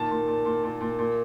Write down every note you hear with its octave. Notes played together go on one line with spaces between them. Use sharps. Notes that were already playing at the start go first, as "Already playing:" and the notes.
Already playing: A#2 D#3 A5
A#2
A#2
A#2
A#2
A#2
A#2